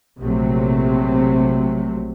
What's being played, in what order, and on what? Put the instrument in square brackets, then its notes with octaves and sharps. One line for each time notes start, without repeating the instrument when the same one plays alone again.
[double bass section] A#1 C3 F#3 A3